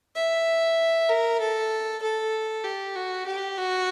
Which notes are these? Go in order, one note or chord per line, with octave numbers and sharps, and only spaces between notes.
E5
A#4
A4
A4
G4
F#4
G4
F#4